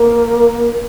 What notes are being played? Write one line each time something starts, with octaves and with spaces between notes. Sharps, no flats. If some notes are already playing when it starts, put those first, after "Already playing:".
Already playing: A#3